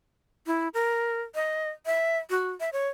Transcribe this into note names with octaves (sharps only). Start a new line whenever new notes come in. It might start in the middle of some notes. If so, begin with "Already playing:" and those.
E4
A#4
D#5
E5
F#4
E5
C#5